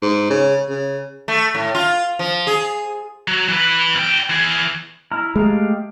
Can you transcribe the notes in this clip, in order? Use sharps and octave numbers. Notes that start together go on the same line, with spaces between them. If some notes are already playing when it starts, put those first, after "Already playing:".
G#2
C#3
C#3
A3
A2
F4
F3
G#4
F#3
E3 B4
E2 G5
E3 G#4
E4 A#5 F6
G#3 A3 G4 F5